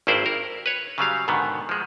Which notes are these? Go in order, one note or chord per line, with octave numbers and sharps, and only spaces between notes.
G#1 G2 A#3 E4 C5 D5
A#4
B4 C#5
C#3 F#3 G3 F5
G#2 B2 D3 D#3 B3
F3 G#3